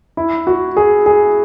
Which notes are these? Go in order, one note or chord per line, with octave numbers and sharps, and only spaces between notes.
E4
F#4
G#4
G#4